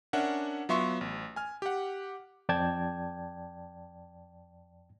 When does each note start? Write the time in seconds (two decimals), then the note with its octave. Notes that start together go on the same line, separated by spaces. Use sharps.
0.13 C#4 D4 A#4 E5 F#5
0.69 F#3 B3 F4 E5 C6 C#6
1.01 A1
1.36 G#5 F6
1.62 G4 F#5
2.49 F2 D5 G5 A5 G#6